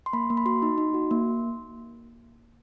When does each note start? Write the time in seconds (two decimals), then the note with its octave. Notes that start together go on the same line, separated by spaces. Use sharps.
0.06 C6
0.13 A#3 B5
0.30 A#3
0.37 B5
0.46 F#4 C6
0.62 D#4
0.78 D#4
0.94 F#4
1.11 A#3